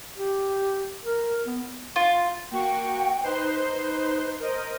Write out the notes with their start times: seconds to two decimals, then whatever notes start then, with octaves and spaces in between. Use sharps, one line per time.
0.18 G4
1.04 A#4
1.46 B3
1.96 F4
2.51 A#3 F#4 G5 C#6
3.23 D#4 B4 C5 C6
3.71 B4
4.40 A#4 C5 D#5